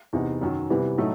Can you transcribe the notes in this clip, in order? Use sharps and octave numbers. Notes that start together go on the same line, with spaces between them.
E2 C3 E3 B3 D#4
F#2 D#3 F#3
C3 E3 G3 B3
A2 F#3 A3 D#4